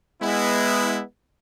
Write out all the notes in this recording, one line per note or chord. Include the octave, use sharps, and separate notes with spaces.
G#3 B3 E4